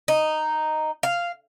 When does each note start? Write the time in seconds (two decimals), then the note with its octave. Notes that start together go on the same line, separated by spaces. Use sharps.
0.08 D#4
1.03 F5